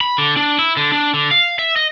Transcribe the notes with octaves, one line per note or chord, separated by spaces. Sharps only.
B5
D3
D4
E4
D3
D4
D3
F5
E5
D#5